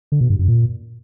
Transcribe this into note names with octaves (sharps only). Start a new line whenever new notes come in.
D3
B2
G2
F#2
A#2